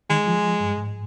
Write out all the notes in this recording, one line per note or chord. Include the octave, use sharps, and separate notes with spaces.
D#3 G#3
F3
G2
G#2